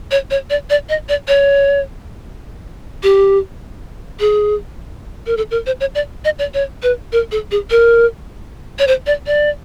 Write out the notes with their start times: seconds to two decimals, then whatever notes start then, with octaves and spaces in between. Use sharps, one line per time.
0.11 C#5
0.31 C#5
0.50 D5
0.70 D5
0.89 D#5
1.09 D5
1.28 C#5
3.03 G4
4.20 G#4
5.26 A#4
5.37 A4
5.51 A#4
5.66 C5
5.80 C#5
5.95 D5
6.25 D#5
6.39 D5
6.54 C#5
6.83 B4
7.12 A#4
7.32 A4
7.51 G#4
7.71 A#4
8.79 C#5
8.87 C5
9.07 D5
9.27 D5